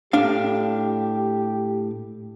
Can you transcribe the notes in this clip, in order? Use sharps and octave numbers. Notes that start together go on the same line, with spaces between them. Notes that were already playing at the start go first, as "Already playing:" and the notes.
A2 D4 G4 F5